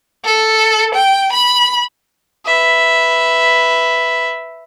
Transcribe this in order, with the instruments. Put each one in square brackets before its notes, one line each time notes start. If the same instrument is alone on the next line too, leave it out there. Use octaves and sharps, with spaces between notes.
[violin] A4
G5
B5
[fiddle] B4 E5